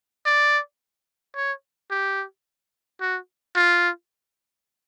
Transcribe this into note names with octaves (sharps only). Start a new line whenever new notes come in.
D5
C#5
G4
F#4
F4